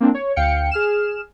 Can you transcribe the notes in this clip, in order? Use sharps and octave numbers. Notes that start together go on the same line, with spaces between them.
A#3 C4 D4
C#5
D2 F5 G5 C#7
G#4 F6 E7